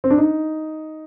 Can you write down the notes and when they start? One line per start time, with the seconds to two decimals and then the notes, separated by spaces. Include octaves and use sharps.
0.04 C4
0.10 D4
0.18 D#4